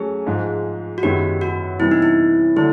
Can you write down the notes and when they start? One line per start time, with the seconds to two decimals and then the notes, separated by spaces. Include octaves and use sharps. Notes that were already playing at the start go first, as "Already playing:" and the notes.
Already playing: F#3 A3 C#4 G#4
0.27 G#2 F3 G#3
0.98 F#4
1.03 F#2 D#3 G#3 B3 E4 G4
1.41 F#4
1.80 C3 E3 G3 B3 E4
1.91 D#4
2.02 E4
2.56 D3 F#3 A3 D4 E4